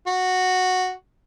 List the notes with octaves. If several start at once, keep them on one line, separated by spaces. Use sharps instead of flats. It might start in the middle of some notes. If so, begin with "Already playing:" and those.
F#4